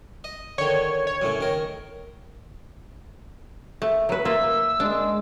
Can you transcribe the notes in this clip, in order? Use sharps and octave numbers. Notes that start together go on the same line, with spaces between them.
D#5
D3 D#3 C#5
C#5
F#2 A2 C#3
D#3 A#4
A3
F#3 B4
A#3 F4 E5 E6
G#3 D4